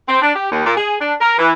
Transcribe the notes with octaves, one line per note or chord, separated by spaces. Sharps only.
C4
D4
G4
D#2
A#2
G#4
D4
A#4
E3